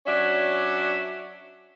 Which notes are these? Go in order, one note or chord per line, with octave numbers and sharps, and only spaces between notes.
F#3 C#4 D4 D5 E5